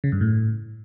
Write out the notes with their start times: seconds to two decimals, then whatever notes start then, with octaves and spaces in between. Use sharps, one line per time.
0.04 C#3
0.12 G2
0.21 A2